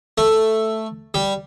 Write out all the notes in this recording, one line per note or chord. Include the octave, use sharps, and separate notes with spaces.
A3
G3